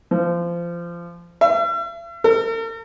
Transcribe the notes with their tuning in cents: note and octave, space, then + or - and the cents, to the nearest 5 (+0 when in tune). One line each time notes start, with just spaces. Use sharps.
F3 -25
E5 +45
A#4 -45